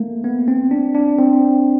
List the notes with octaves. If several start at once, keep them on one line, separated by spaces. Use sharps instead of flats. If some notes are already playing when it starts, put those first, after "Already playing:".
Already playing: A3 A#3
B3
C4
D4
D4
C4